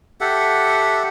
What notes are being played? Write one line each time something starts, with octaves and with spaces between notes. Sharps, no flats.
G4 A4 E5 F#5